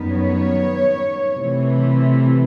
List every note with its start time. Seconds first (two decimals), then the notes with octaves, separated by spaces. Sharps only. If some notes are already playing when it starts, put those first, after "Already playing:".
Already playing: F#2 D#3 G3 B3
0.11 C#5
1.35 C3 E3 A3